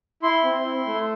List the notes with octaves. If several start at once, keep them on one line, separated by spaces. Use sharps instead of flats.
E4 C6
C4
E4
A3